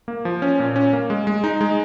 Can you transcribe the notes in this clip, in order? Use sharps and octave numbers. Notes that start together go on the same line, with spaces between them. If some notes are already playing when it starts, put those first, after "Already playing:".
A#3
F3
C#4
A#2
C#4
A#3
G#3
G#3
D#4
G#3